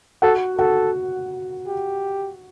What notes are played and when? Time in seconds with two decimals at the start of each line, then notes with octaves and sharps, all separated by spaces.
0.22 F#4 A4 F#5
0.58 F#4 A4 F#5
1.67 G4